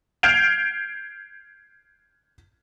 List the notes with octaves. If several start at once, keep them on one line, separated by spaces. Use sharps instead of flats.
F6 G6 G#6 C7 D7 F7